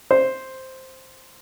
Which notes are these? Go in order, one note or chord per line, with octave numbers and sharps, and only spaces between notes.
C5